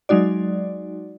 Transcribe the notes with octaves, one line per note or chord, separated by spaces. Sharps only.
F#3 G#3 D#4 F#4 D5